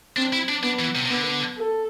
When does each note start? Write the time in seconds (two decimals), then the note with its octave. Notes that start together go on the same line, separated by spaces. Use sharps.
0.17 C4 D4
0.33 E4
0.48 D4
0.63 B3 D4
0.79 E3
0.95 C3
1.05 C3
1.10 D3 B3
1.57 A4